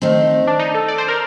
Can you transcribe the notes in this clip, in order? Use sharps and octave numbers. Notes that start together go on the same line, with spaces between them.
D#3 A3 C4 D#4
D4
D#4
A4
D5
C5
A#4